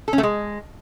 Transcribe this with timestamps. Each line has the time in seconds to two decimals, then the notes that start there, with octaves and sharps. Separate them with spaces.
0.08 A4
0.13 C#4
0.18 A3
0.23 G#3